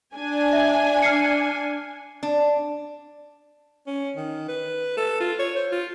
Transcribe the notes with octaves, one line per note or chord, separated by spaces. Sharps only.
D4 G#5
E5
F6 C7 C#7
D4
C#4
D#3
B4
A4
F4
C#5
C5
F4